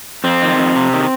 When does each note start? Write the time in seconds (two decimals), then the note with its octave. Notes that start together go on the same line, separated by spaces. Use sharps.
0.24 F2 C4
0.42 D#3
0.58 F2
0.75 C3
0.93 D#3